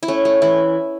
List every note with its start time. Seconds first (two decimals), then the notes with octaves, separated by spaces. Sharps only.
0.03 E4
0.08 A3 C#4
0.25 A3
0.42 E3 E4